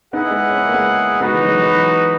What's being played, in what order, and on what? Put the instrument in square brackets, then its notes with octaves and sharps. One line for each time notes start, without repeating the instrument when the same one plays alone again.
[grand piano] B3 D#4 [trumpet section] E4 G#4 D#5 F#5
[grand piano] G#3 B3
C#4
B3
A#3
G#3 B3
[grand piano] G#3 B3 [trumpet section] D#4 F#4 B4
[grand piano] E3 G#3
F#3
E3 G#3
F#3
E3